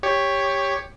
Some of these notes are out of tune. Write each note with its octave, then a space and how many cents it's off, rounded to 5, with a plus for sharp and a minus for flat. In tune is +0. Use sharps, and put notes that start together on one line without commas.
G4 +15 C#5 +0